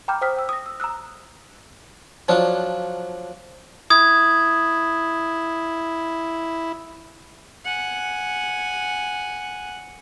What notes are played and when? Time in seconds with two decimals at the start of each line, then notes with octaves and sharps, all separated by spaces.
0.08 G5 A#5 B5 D6 F6 G6
0.21 C5 G5 D#6 F6 B6
0.37 G5 E6
0.49 D#6 A#6
0.66 E6
0.80 A#5 D#6 E6 F#6
2.28 F3 F#3 D4
3.90 E4 D#6 G#6
7.65 F#5 G#5